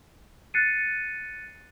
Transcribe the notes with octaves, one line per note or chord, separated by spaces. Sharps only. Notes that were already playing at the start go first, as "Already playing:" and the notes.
F#6 A6 C7 C#7 D#7